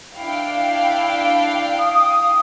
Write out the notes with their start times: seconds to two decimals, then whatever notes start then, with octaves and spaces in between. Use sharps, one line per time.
0.16 D4 E4 F5 G5
1.79 D#6